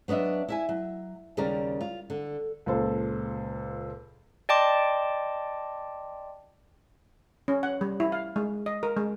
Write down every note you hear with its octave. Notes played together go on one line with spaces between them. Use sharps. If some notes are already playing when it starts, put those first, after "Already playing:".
F#3 B3 D4 D#5 E5
E4 E5 G#5
F#3
D#2 C#3 G3 G4 A#4 D5
F4
D3
C#2 A#2 A4 C5
D5 D#5 G5 A5 C6 D6
C#4
F#5
G3
E4
F5
G#3
D#5
A#4
G#3